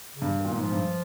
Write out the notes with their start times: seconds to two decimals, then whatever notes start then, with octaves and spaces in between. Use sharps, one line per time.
0.15 C#3
0.22 G2
0.36 D#3
0.45 A#2
0.51 G#2
0.59 F3
0.72 G2